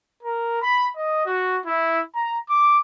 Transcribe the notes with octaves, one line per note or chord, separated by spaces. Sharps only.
A#4
B5
D#5
F#4
E4
A#5
D6